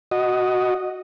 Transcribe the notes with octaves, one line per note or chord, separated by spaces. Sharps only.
F#4 D#5